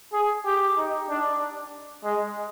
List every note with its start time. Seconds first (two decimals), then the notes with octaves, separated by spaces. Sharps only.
0.13 G#4
0.46 G4
0.77 D#4
1.09 D4
2.04 G#3